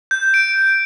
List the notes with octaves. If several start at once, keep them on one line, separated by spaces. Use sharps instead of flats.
G6
D7